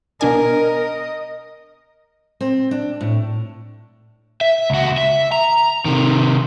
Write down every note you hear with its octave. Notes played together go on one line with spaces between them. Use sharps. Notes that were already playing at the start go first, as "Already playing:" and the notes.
B2 D4 A#4 D#5 G#5
C4
D4
A2
E5
C#2 F#4
E5
A#5
C3 D#3